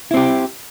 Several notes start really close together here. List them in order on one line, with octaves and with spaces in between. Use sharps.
E4 C4 G4